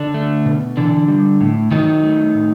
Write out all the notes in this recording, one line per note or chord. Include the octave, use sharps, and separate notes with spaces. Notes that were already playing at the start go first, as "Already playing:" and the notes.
Already playing: D3 D4
A3
B2
D3 E3 D4
G3
A2
D#3 F#3 D#4
A3
A2